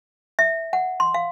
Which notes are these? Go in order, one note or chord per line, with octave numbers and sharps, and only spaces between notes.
E5
F#5
C6
F5